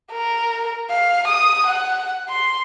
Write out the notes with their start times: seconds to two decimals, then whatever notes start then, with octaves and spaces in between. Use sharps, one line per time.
0.12 A#4
0.90 F5
1.28 D#6
1.67 F#5
2.29 C6